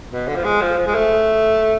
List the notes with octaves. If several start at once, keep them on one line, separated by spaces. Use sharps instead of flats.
B2
D3
F3
G#3
F3
F3
G#3
A3